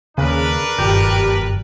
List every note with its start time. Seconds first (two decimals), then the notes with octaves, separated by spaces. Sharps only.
0.18 D#2 C#3 D4 A#4 B4
0.78 F#1 G2 A#2 D#3 G4